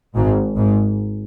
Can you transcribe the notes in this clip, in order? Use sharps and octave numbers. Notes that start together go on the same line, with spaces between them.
G#1 G#2
G#1 G#2